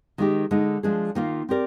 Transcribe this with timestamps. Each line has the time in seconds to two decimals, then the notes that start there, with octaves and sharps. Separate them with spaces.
0.18 D#3 G#3 D#4 G4
0.51 D3 G#3 D#4
0.83 F3 G#3 D4 G#4
1.15 D#3 A#3 F4
1.49 C4 G4 A#4 D5